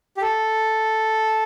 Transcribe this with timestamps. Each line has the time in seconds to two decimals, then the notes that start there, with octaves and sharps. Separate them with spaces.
0.17 G4
0.21 A4